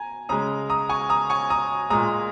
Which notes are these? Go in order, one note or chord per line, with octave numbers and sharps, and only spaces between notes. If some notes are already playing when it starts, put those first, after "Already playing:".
Already playing: G#5 A#5
C#3 G#3 A#5 D#6
A#5 D#6
G#5 C#6
A#5 D#6
G#5 C#6
A#5 D#6
A#2 G#3 A#5 D#6